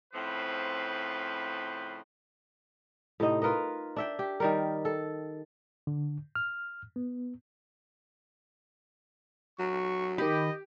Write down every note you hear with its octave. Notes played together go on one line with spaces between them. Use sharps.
A2 C#3 F3 C4 B4
A2 C3 D#4 D#5
F4 A#4 B4 D#5
D4 E5 G5
G4
D#3 G3 A#4
A4
D3
F6
B3
F#3 C#6
D#3 G4 D#5 B5